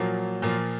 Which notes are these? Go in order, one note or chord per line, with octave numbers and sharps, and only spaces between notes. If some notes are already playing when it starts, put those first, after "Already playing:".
Already playing: A#2 F3 F#3 A#3
A#2 F3 A#3